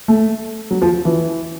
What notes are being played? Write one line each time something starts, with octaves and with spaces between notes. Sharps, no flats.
A3
F#3
F3
F3
E3